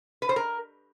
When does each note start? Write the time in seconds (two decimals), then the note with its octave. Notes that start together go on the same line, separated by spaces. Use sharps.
0.22 B4
0.29 C5
0.36 A#4